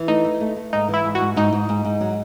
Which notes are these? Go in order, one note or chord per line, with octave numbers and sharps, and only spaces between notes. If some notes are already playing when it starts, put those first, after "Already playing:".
Already playing: E3
A3 D#4
E4
A3
A3
G#2 D#4
E3
E4
G#2
F#4
G#2
G#2 D#4
G#2
G#2
G#2
F#3